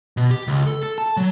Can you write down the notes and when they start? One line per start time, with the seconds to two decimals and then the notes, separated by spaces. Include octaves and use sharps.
0.17 B2
0.31 G4
0.47 C#2
0.67 A4
0.83 A4
0.98 A5
1.17 F#3